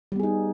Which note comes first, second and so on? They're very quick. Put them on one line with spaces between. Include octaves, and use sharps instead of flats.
G3 B3 G#4 D#4